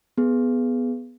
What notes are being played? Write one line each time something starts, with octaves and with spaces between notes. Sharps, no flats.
B3 G#4